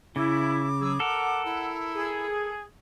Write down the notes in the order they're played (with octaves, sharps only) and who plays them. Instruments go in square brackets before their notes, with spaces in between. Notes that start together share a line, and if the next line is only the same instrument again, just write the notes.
[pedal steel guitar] C#3 [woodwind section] E4 [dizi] D6
[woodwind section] F#3 G#4 E6
[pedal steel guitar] A4 A#4 [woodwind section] F#5
[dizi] E4
[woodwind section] G#4